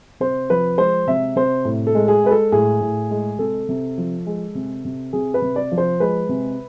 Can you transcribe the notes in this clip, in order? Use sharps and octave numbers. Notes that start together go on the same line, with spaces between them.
C3 C5
F3 B4
G#3 C5
C3 E5
C3 C5
A2
A4
G#3
G#4
G#3 B4
A4
A2 G#4
A2
G#3
C3 A4
C3
F3
G#3
C3
C3
C3 G#4
B4
C3
D5
F3
C5
G#3 B4
C3